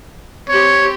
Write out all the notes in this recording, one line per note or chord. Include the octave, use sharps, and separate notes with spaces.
C4 G4 C#5